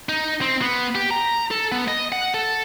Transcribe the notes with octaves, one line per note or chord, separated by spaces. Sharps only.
D#4
C4
B3
G4
A#5
A4
B3
D#5
F#5
A4